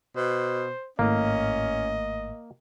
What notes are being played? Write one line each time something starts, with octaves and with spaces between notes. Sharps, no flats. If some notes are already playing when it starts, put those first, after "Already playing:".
B2 C5
G#1 A2 A#3 C#4 D#5